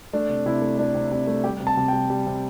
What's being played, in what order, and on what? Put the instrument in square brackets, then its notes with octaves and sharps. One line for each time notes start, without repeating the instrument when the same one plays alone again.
[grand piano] A3 D4
C3
C3 E4
A3
A3 D4
C3
C3 D4
A3
G3 G4
C3
A5
C3
G3 G5
G3
C3